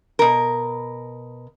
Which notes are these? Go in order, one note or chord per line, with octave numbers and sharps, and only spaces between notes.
B2 A#4